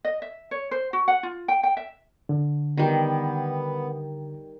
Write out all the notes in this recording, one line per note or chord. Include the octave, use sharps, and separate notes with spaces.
D#5
E5
C#5
C5
F#4
F#5
F4
G5
G5
E5
D3
D#3 G3 B3